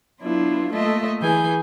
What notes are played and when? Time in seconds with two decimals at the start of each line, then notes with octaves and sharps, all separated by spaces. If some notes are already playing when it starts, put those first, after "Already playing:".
0.20 F#3 B3 D4 E4 F4
0.72 A3 A#3 F4 A4 D#5 E5
1.21 E3 G#4 G#5 G6